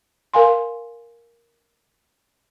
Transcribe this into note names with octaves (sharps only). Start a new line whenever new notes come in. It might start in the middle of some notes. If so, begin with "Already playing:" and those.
A#4 F5 G#5 C6